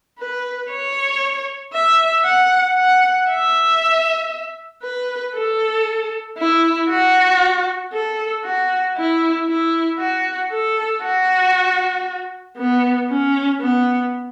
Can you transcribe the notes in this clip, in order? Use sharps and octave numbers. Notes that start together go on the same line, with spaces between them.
B4
C#5
E5
F#5
F#5
E5
B4
A4
E4
F#4
A4
F#4
E4
E4
F#4
A4
F#4
B3
C#4
B3